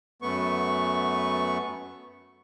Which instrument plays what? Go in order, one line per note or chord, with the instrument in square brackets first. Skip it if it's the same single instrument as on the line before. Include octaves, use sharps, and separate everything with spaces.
[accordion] F#2 A3 B3 C#6